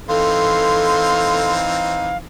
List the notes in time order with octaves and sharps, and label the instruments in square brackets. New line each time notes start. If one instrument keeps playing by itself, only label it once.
[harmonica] E3 C4 D#4 [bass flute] A4 [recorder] F5 [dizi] C6